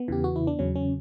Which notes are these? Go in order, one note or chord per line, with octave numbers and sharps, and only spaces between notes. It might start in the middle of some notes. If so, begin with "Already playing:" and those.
Already playing: B3
E2 C#3 E3 G4
F#4
E4
D4
E2 C#3 F#3 C#4
C#4